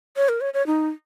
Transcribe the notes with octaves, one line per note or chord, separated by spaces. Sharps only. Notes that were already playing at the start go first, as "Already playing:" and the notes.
C#5
A#4
C#5
C#5
D#4